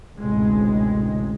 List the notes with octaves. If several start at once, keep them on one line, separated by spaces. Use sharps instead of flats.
A1 D2 C3 G#3